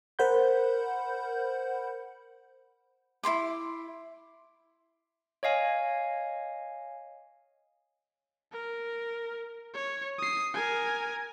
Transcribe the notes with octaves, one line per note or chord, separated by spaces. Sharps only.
A#4 C5 F#5 B5 G6
E4 F#4 C6 D6
C#5 D#5 F5 G#5
A#4
C#5
D#6 C7
A#4 G#5